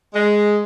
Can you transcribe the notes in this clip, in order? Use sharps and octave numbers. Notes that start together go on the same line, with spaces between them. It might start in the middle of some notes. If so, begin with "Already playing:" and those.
G#3